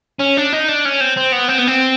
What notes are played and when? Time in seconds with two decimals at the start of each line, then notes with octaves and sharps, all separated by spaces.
0.19 C#4
0.37 D4
0.52 D#4
0.68 D4
0.85 C#4
1.01 C4
1.17 C4
1.33 B3
1.49 C4
1.59 B3
1.68 C4